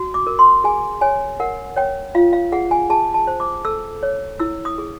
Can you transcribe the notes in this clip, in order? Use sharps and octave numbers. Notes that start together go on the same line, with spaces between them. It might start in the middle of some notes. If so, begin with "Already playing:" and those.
Already playing: F#4
D6
A#4
C6
G#4 G#5
C#5 G#5
A#4 F#5
C#5 G5
F4 F5
F5
G#4 F#5
G#5
G#4 A5
A5
C5
D6
A4 E6
C#5
E4 E6
D#6
G#4